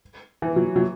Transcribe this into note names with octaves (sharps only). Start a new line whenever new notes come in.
E3
F#3
F#3